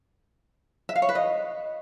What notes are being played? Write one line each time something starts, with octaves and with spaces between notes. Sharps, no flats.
E5
F5
C#5
B4
D#5